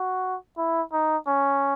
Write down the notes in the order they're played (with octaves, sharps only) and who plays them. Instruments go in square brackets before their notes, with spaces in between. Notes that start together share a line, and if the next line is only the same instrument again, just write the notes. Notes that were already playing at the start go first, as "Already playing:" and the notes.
Already playing: [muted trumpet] F#4
E4
D#4
C#4